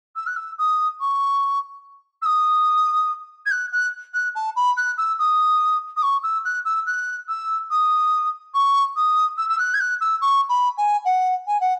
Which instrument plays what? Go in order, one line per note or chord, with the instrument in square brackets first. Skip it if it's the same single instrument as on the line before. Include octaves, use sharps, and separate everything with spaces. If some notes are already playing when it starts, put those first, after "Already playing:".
[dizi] E6
F#6
E6
D#6
C#6
E6
D#6
G#6
F#6
F#6
F#6
A5
B5
F#6
E6
D#6
D#6
C#6
E6
F#6
E6
F#6
E6
D#6
C#6
D#6
E6
E6
F#6
G#6
F#6
E6
C#6
B5
G#5
F#5
G#5
F#5